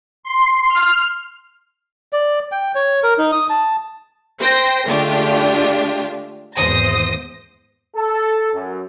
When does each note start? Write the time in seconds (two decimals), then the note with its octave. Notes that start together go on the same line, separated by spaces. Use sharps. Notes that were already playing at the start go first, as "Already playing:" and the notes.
0.23 C6
0.68 F6
2.13 D5
2.52 G5
2.75 C#5
3.03 A#4
3.18 D#4
3.32 D#6
3.50 A5
4.41 C5 G5 A#6
4.86 D3 G#3 A3 D4 F4 G4
6.56 G#1 E2 C5 D#6 A#6
7.96 A4
8.54 F#2